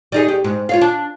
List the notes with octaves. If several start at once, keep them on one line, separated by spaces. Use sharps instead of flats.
G3 D#4 G#4
G4
G#2
F4 C#5 F5
D4